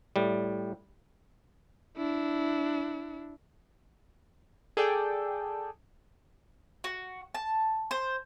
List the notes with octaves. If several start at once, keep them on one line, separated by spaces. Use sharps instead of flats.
A2 G3
D4 E4
G#4 A4 D5 G5
F#4
A5
C5